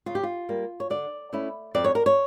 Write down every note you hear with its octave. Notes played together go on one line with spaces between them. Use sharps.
C#3 F4
G4
F4
G3 A#3
C#5
D3 D5
A3 C#4 E4
F2 D5
C#5
A#4
C#5